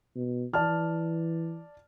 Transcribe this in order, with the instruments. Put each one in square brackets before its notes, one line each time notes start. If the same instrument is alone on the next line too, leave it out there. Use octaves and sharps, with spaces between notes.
[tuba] B2
[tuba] E3 [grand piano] D5 A5 F6